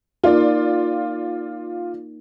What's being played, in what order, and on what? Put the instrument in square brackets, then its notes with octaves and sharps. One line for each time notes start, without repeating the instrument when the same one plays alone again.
[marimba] A#3 D#4 A#4 [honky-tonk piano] F4 D5